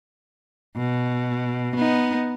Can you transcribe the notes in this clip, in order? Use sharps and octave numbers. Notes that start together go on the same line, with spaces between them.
B2
B3 D#4